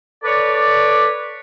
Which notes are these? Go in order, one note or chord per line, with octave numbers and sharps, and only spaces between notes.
A4 B4 C#5 D5